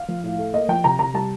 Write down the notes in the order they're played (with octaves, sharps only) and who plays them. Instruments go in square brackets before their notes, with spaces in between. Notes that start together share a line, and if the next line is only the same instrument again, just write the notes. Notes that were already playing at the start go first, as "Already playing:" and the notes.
Already playing: [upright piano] F5
F3
A2
A3
A#3 D#5
F3 G5
C3 A#5
C3 A#5
G3 A5